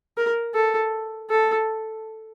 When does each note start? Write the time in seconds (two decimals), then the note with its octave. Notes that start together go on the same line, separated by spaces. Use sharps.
0.17 A#4
0.54 A4
1.30 A4